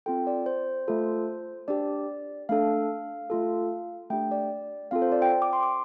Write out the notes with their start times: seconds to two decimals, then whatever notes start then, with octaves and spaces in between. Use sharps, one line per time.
0.06 C4 F4 A4 G5
0.27 D5
0.46 C5
0.88 A3 F4 A4
1.68 D4 G4 D5
2.49 A3 D4 A4 F5
3.30 A3 F4 A4
4.10 A3 D4 G4 G5
4.31 D5
4.91 C4 F4 A4 F5
5.02 C5
5.12 D5
5.22 G5
5.32 G5
5.42 D6
5.53 C6
5.63 D6